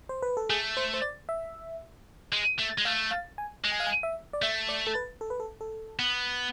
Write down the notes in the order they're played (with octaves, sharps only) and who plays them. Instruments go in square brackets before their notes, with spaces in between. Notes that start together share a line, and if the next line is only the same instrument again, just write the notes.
[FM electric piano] C5
B4
A4
[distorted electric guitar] A3 [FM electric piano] G#4
[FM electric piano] C5
C5
D5
E5
[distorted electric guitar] G#3
A3
G#3
[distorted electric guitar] A3 [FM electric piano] F5
[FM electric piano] F5
G#5
[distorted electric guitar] G#3
[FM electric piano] G#5
F5
G#5
E5
D5
[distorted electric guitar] A3 [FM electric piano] E5
[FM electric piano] D5
A4
B4
A4
B4
A4
A4
[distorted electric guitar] B3